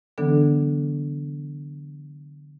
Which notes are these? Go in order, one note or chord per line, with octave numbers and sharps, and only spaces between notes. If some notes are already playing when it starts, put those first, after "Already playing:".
D3 E3 F#3 B3 D4 A4